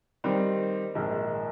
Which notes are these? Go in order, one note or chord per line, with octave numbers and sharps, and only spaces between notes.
D#3 G3 C4 D#4
A#1 G#2 D#3